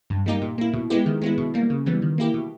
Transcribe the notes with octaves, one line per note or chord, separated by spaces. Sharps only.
G2
G3 A#3 D#4 G4
A#2
A#3 E4
B2
G#3 B3 E4 G4
D#3
G#3 B3 E4
B2
G3 A#3
C#3
E3 G3 B3
D#3
A#3 E4 G4
B2